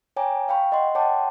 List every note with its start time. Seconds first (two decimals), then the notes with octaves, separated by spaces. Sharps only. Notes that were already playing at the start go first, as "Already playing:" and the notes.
0.17 C#5 G5 G#5 A#5 D6
0.49 F5 G5 B5 C#6
0.72 D#5 F#5 C6
0.95 C#5 F#5 G5 A5 C6 D6